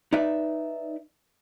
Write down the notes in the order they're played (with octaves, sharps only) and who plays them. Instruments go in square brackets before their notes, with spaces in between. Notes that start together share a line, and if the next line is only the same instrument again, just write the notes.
[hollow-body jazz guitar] D#4 B4 D5 E5